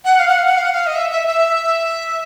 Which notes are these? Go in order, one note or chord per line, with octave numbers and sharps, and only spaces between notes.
F#5
F5
F#5
F5
F#5
F5
F#5
F5
D#5
E5
E5
E5